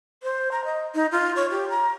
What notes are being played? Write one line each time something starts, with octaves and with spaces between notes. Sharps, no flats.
C5
A#5
D#5
D#4
F4
C#5
G4
A#5